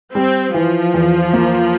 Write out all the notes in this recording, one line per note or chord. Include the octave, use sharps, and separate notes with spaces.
G3 C4
E3 F3
E2
A#3